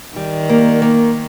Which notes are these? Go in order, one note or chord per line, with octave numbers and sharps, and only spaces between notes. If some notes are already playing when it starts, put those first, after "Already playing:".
D#3 G3
A#3
A#3